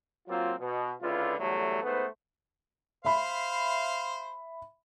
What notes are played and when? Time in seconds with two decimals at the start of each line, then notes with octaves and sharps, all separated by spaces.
0.27 F#3 A#3 C4 F4
0.60 B2
1.02 C#2 D3 E4 F4 B4
1.38 E2 F#3 G3 A3
1.83 G#2 A3 B3 B4 C5
3.05 C5 E5 F5 B5